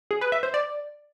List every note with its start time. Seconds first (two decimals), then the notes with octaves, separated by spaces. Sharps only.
0.11 G#4
0.21 B4
0.32 E5
0.43 C5
0.54 D5